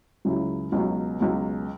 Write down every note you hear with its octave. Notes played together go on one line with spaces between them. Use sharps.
C#2 C#3 F#3 E4
C#2 B2 F#3
C#2 B2 F#3